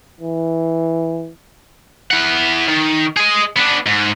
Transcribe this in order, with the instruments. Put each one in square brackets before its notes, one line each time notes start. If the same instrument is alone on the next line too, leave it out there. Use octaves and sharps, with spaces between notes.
[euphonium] E3
[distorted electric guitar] E4 F#5
D#3
G#4 D#5
B3 D4
G#2